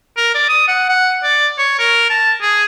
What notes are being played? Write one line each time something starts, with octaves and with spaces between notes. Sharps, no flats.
A#4
D5
D#6
F#5
F#5
D5
C#5
A#4
A5
G#4